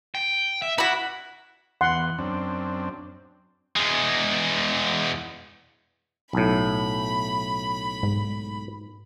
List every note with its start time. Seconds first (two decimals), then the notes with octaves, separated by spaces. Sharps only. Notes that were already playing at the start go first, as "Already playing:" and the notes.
0.15 G5
0.62 E5
0.78 E4 F#4 B5
1.81 E2 F#5 C6
2.18 F#2 C4 D4
3.76 E2 G#3
6.33 B1 A2 B5
8.03 G#2